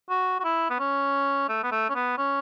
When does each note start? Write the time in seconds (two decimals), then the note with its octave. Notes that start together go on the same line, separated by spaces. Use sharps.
0.10 F#4
0.40 F#4
0.44 E4
0.70 B3
0.80 C#4
1.49 A3
1.64 B3
1.72 A3
1.89 C#4
1.95 B3
2.18 C#4